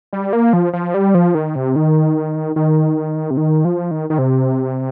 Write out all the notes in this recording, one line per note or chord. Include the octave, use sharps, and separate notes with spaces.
G3
A#3
F3
F3
G3
F3
D#3
C3
D#3
D#3
C3
D#3
F3
D#3
D#3
C3